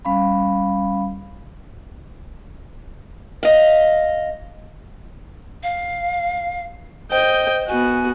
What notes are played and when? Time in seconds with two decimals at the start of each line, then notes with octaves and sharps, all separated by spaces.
0.05 G3 C#4 F5 B5
3.43 D#5 F5
5.63 F5
7.11 C5 D#5 G5
7.68 B3 F#4 G#5